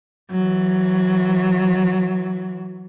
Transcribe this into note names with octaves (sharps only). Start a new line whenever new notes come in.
E3 F#3